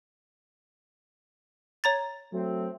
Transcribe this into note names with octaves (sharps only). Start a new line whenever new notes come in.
C#5 A#5 A6
F#3 A3 C4